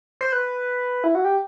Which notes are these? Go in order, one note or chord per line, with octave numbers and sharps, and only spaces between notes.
C5
B4
E4
F#4
G4